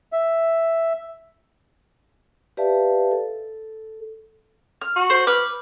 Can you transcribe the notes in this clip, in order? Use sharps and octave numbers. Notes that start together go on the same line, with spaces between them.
E5
G4 B4 D5 E5 F5 A5
A4
F6
F#4
C5
B4 D6 F6